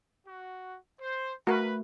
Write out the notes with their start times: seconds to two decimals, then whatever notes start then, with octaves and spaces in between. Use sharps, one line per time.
0.26 F#4
1.00 C5
1.47 A3 F#4 A#4 B4